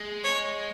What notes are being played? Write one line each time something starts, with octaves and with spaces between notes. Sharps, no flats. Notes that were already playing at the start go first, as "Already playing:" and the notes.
Already playing: G#3
C#5